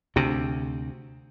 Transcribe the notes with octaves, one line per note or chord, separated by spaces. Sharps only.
D2 C3